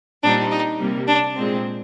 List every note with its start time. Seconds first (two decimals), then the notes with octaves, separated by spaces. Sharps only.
0.23 A#2 G3 C4 D4 D#4
0.51 D#4
0.79 C3 G3 A#3
1.07 D4
1.36 A#2 G#3 C4